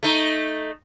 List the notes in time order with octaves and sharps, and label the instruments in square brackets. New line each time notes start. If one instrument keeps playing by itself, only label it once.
[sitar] A3 D#4